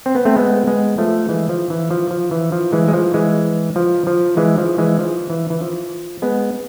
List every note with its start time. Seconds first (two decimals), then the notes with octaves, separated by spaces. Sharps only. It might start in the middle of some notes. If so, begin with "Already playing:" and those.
0.06 C4
0.15 B3
0.25 A3 C4
0.36 G#3 B3
0.67 G#3 B3
0.98 F3 A3
1.29 E3 G#3
1.49 F3
1.70 E3
1.91 F3
2.11 F3
2.31 E3
2.52 F3
2.72 E3 G#3
2.88 G#3
2.93 F3
3.14 E3 G#3
3.76 F3
4.07 F3
4.37 E3 G#3
4.58 F3
4.78 E3 G#3
4.99 F3
5.30 E3
5.50 E3
5.61 F3
6.22 G#3 B3